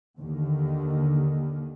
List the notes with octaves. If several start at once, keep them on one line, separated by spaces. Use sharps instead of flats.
D#2 D3 D#3